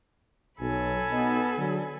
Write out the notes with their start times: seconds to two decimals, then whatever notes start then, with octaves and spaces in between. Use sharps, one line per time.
0.60 B1 F#3 A4 G#5 B5
1.10 B2 B3 D#4
1.58 D3 F#3 D4